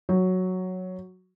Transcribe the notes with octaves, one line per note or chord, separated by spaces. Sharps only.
F#3